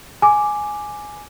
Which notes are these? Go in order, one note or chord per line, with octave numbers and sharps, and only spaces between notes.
G#5 D6